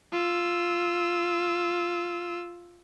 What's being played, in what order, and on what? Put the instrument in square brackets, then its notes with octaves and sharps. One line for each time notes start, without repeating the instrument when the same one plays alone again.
[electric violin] F4 E6